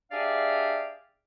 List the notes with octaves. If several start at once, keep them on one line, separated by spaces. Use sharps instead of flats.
D4 G4 G#4 D5 E5 F5